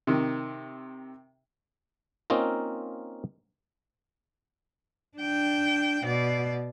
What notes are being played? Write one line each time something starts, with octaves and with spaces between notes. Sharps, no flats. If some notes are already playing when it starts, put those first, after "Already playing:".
C3 D#3
A#3 C4 C#4 D#4 F4 A#4
D4 G5
B2 D5